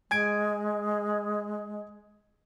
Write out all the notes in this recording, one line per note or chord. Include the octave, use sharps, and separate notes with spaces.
G#3 G#5 G#6 D7